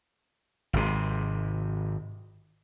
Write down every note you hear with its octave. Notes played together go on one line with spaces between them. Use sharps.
G#1 C3